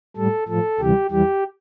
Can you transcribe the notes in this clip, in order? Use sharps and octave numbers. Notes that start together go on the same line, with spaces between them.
A2 G3 A4
A2 F3 A4
D2 C3 E3 G3 G4
E2 E3 G3 G4